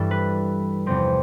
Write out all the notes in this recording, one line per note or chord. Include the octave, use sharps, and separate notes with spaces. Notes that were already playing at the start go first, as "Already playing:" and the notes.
Already playing: G2 E3 G3 A4
B4
E2 C3 F3 C4